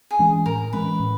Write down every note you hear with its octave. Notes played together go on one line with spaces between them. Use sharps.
G#4
E3 G#3 C#4
A2 A#4
E3 G#3 C#4 B4
A2